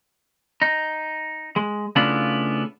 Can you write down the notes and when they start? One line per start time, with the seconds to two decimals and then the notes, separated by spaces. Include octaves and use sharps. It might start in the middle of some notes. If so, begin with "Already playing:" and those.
0.62 D#4
1.56 G#3
1.96 C#3 A3 B3 D4 E4 F4